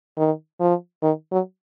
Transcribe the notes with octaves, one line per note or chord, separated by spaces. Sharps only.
D#3
F3
D#3
F#3